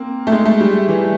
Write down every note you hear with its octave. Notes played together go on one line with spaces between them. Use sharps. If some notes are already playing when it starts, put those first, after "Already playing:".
Already playing: A#3 C4
A3
G#3
A3
G3
E3